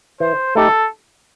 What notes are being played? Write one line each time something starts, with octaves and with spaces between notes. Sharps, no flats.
E3 C5
A3 D#4 G4 A4